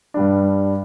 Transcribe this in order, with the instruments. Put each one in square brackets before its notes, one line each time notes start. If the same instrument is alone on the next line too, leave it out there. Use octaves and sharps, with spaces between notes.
[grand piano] G2 G3 D4